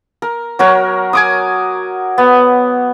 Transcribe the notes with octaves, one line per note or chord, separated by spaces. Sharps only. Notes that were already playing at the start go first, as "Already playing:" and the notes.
A#4
F#3 F#4 A#4 C#5
G#5 D6 D#6
B3